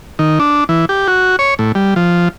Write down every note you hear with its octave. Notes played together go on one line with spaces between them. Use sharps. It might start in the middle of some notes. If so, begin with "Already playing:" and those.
D#3
D4
E3
G4
F#4
C#5
A2
G3
F3